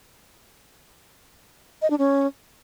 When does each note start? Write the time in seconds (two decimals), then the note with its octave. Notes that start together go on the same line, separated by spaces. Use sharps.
1.82 D#5
1.90 D4
1.99 C#4